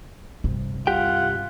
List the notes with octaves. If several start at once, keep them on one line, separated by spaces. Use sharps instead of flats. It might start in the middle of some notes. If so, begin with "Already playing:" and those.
G2 C3
C2 F4 G4 F#5 G5